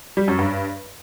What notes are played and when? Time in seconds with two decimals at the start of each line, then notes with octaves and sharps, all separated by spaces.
0.17 G3
0.28 F#2
0.39 G2